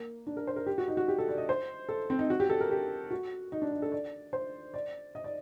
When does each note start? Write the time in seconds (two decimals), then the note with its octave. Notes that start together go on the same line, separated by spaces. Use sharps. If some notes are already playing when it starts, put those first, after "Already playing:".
Already playing: A#3
0.27 D4
0.37 A#4
0.47 C5
0.56 A#4
0.67 G4
0.78 F#4
0.88 D#4
0.97 F#4
1.08 G4
1.19 A4
1.29 D5
1.38 D#5
1.49 C5
1.89 A4
2.10 C4
2.19 D#4
2.30 F#4
2.40 G4
2.50 A4
2.61 A#4
2.71 G4
3.11 F#4
3.52 D#4
3.62 D4
3.72 D#4
3.82 A4
3.92 D5
4.33 C5
4.74 D5
5.15 D#5
5.24 D5